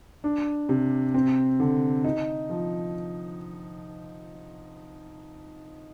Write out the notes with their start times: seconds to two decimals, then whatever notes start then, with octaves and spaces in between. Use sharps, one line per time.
0.24 D4
0.69 C3
1.14 C4
1.60 D3
2.04 D#4
2.50 F3